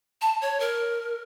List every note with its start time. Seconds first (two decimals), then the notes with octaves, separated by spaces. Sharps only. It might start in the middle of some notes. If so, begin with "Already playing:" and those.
0.22 A5
0.41 C#5
0.60 A#4